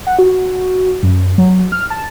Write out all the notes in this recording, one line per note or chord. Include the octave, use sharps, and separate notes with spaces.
F#5
F#4
F#2
F#3
F6
A5